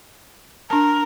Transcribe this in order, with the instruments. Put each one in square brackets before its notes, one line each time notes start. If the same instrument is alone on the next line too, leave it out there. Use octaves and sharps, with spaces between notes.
[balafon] D4 A5 [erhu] A#4